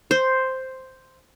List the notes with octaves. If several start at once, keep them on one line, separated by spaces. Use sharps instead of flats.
C5